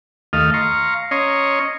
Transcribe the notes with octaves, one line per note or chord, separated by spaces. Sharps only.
D#2 A3 D#5 F5 F6
F5 A#5 C6 C#6
C#4 C#5 D#5 A#5 C6